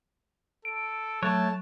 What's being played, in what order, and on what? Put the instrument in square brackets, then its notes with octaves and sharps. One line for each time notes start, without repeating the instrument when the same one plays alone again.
[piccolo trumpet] A4 [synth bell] D7
[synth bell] F#3 [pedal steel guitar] A3 C#5 [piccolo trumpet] A5